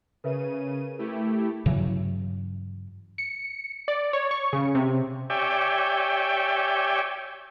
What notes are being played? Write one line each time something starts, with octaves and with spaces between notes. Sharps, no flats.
C#3 A#4 B4 E5 D#7
A3 E4 G4
G2 C#3 E3 F#3
C#7
D5
C#5
C#6
C#3
C3
G4 C#5 D5 E5 G5 G#5